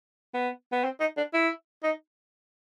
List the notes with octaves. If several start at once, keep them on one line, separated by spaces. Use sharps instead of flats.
B3
B3
C4
D#4
D4
E4
D#4